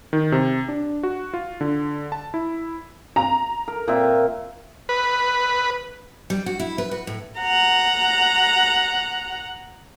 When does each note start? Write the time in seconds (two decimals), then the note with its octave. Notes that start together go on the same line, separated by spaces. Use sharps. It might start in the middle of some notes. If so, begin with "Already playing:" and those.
0.13 D#3
0.32 C3
0.68 D4
1.03 F#4
1.34 F4
1.61 D3
2.12 A5
2.34 E4
3.16 A#5
3.68 A#4
3.88 A#2 C4 E5
4.89 B4
6.30 G3
6.46 F#4
6.60 E4
6.78 B4
6.91 F#4
7.07 A2
7.40 F#5 A#5